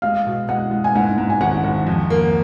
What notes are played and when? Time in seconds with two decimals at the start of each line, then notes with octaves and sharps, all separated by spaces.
0.02 G#3 F5
0.26 B2
0.49 G#3 F#5
0.71 G#3
0.84 G#5
0.95 G#2 F#5
1.18 G#2
1.30 G#5
1.41 G#1 F#5
1.64 G#1
1.87 F2
2.10 A#3